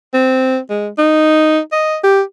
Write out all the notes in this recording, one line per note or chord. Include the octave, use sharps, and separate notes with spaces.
C4
G#3
D#4
D#5
G4